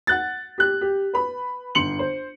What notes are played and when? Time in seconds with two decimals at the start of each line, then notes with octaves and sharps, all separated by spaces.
0.07 F#5 F#6 A6
0.58 G4 F#6
0.81 G4
1.14 B4 B5
1.75 G1 C6 C#7 F#7
1.99 C5